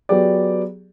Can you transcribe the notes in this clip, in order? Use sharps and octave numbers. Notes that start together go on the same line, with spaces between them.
F#3 B3 G4 G#4 D5